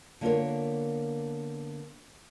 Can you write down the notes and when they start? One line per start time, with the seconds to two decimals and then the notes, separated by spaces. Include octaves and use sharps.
0.21 D3 A#3 B3 F4 A#4 C#5